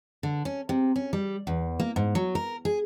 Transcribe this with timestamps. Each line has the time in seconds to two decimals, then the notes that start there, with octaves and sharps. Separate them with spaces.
0.23 D3
0.45 C#4
0.69 C3
0.96 C#4
1.13 G3
1.47 E2
1.80 A#3
1.96 G#2
2.15 F#3
2.35 A#4
2.65 G#4